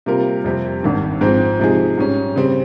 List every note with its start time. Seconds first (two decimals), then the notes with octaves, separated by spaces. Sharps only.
0.06 C3 G3 A#3 F4 A#4
0.44 F2 C3 G3 C4
0.83 G#1 G2 D#3
1.21 G#2 F3 C4
1.59 C3 F3 G#3 D#4 G#4
1.98 G#2 G3 C#4
2.36 C#3 G3 C4